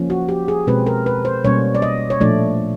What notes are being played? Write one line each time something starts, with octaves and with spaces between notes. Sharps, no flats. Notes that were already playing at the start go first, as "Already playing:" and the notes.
Already playing: F3 A#3 C#4
F#4
G4
G#4
B2 G#3 C4 B4
A#4
B4
C5
B2 G3 A#3 C#4 C#5
D5
D#5
C#5
A#2 F3 A3 D4 D5